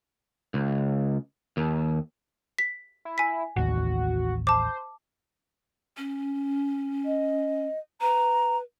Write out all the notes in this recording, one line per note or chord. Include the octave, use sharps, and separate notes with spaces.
C#2
D#2
B6
E4
G#5 B6
A1 D#2 F#4
C5 A5 D6
C#4
D#5
B4 A#5